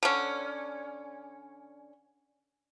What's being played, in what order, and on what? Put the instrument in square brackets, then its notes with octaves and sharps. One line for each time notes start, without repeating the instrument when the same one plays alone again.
[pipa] D3 C#4